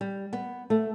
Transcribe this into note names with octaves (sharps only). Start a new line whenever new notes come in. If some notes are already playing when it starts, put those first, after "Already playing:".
G3
B3
A3